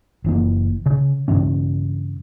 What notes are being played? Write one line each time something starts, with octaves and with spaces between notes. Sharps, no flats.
F#1 E3 A#3
C#3
G2 C#3 E3 C#4